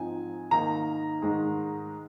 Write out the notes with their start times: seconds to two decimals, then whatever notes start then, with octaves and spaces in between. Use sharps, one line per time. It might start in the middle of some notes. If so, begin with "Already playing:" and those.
Already playing: G#2 F3 C4 D#4 G#5
0.51 G#2 D#3 A#3 D#4 A#5
1.22 G#2 D#3 G#3